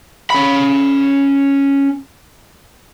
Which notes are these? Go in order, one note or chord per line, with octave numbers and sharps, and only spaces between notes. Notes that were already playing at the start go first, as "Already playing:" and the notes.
C#4 B5